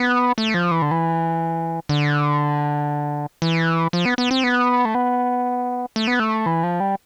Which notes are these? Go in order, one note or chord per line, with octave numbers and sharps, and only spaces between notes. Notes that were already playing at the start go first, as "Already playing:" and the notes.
Already playing: B3
A3
F3
E3
D3
E3
D3
E3
F3
B3
B3
C4
B3
A3
B3
A3
B3
A3
E3
F3
G3